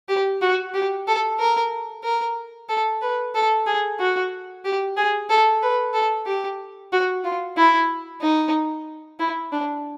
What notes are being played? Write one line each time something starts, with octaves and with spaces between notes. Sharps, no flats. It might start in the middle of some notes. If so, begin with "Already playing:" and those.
G4
F#4
G4
A4
A#4
A#4
A4
B4
A4
G#4
F#4
G4
G#4
A4
B4
A4
G4
F#4
F4
E4
D#4
E4
D4